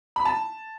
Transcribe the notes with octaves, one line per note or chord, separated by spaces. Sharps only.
B5
A5